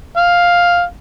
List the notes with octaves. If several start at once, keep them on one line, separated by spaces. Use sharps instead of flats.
F5